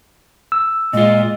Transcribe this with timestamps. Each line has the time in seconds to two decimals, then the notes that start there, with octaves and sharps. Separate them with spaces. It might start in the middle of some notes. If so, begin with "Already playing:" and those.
0.52 E6
0.93 A#2 G#3 F4 D#5